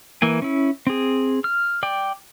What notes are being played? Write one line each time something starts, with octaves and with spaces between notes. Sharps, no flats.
E3 A#3 G#5
C#4 E4
C4 G#4
F6
D5 G5